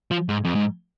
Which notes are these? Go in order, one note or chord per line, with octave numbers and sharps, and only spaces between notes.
F3
G#2
F2
G#2